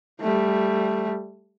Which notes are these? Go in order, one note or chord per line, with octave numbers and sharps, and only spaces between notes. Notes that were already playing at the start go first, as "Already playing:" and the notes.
G3 A3